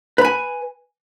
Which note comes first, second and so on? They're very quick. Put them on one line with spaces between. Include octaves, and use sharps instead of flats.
B4 B5 G#5